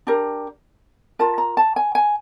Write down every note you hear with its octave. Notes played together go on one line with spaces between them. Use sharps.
D4 G4 A#4
F4 A#4 A5
A#5
A5
G#5
G#5